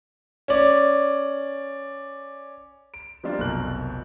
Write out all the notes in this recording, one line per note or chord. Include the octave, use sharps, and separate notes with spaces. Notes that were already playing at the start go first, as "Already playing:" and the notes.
C#4 D5
D7
F3 G3 A#3 C4 D4 F4
F1 B1 F2 A#4 F#6 F#7